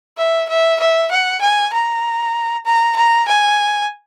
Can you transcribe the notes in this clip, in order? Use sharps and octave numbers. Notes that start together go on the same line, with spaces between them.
E5
E5
E5
F#5
G#5
A#5
A#5
A#5
G#5